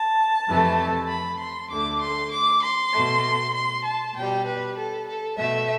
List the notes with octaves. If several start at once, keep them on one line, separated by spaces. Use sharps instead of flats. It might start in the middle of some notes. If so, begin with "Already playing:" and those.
Already playing: A5
F2 C3 E3 A3
B5
C6
D2 D3 A3 D6
C6
D6
C6
B2 A3
C6
A5
B2 G3 G5
B4
A4
A4
B2 A3 E5